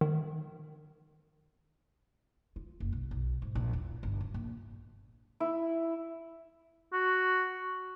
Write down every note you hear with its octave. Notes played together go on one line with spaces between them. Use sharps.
D#3
F4
F#1
B1
B1
G#2
A#1
E2
G1
F4
A#1
E4
F#4